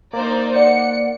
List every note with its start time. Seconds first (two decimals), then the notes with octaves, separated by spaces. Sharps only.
0.13 A#3 D#4 C5 D5 A#5
0.56 D5 F#5 C#7